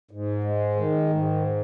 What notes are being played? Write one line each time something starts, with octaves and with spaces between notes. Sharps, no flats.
G#2
G#3
D#3
G#2